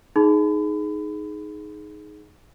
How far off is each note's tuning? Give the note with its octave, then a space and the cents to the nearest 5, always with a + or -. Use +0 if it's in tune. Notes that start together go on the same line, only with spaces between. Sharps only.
D#4 +0 G#4 +15 B5 +35